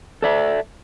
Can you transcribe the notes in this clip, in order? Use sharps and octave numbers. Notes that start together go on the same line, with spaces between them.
A4 D5 E5